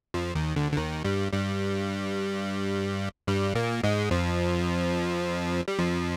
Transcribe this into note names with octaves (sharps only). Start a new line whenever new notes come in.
F2 F3
D#2 D#3
D2 D3
D3
D#2 D#3
G2 G3
G2 G3
G2 G3
A#2 A#3
G#2 G#3
F2 F3
G3
F2 F3